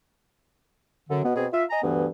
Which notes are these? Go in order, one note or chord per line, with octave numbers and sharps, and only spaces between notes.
F#2 D3
B2 B3
B2 C4 G#4
F4 E5
D#5 G#5 A#5
D2 G2 E3 B3